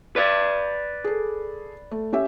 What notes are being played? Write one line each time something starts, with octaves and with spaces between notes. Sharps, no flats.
B4 D5
G#4 A4
A3
C#4 G4 E5